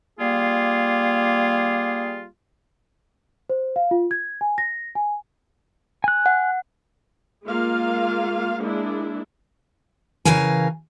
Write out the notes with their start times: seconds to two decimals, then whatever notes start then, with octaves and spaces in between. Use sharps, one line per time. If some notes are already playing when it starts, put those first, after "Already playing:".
0.20 G3 A#3 F4 G#4
3.50 C5
3.76 F5
3.91 F4
4.11 G#6
4.41 G#5
4.58 A#6
4.95 G#5
6.04 G#5 F#6
6.26 F#5
7.46 G#3 A#3 F4 F5
8.59 G#3 A#3 D4 E4
10.25 C#3 E3 A#4 F5 G#5